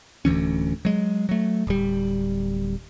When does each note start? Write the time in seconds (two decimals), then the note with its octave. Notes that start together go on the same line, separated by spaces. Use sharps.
0.25 D1 D2 E3 C#4
0.85 F#3 G#3
1.29 F#3 A3
1.67 D1 G3